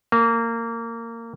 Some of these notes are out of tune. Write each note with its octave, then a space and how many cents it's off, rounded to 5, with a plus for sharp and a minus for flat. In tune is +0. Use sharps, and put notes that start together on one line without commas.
A#3 -20